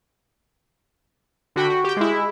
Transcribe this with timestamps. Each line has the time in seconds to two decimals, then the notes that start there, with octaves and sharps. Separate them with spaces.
1.56 D3 F#4 G5 B5
1.70 F#4
1.84 G4 G5
1.97 G#3 E4